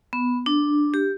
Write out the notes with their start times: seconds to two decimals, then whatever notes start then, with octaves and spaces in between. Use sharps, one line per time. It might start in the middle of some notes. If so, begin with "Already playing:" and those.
0.13 B3
0.46 D4
0.94 G4